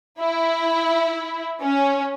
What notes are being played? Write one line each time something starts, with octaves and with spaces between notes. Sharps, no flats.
E4
C#4